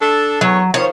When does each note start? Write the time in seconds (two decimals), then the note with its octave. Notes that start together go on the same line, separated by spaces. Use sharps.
0.01 D4 A4
0.41 E2 F#3 C#5
0.74 D#3 F3 C#5